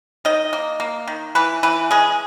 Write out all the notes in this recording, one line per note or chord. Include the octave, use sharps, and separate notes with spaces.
D#3 D#5
A#3
A#3
D#3
E3 B4
E3 B4
G#3 G#4